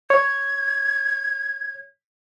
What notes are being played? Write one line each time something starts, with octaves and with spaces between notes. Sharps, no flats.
C#5 G#6